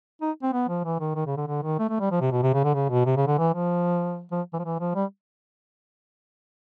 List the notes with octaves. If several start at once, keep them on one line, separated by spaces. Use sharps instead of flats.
D#4
C4
B3
F3
E3
D#3
D#3
C#3
D3
D3
D#3
A3
A3
G3
F3
C3
B2
C3
C#3
D3
C#3
B2
C3
C#3
D3
E3
F3
F3
E3
F3
E3
F3
G3